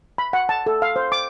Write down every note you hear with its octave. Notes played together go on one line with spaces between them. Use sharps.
B5
F#5
A5
A4
F5
C5
D6